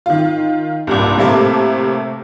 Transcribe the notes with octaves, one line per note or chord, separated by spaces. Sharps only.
D#3 F4
C2 G2 A#2
A2 C3 A3 A#3 A5 D6